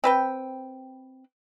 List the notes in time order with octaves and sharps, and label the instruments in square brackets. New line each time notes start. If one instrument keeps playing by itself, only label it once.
[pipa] C4 B4 G5